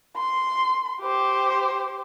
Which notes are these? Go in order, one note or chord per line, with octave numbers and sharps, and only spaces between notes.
C6
G4 C5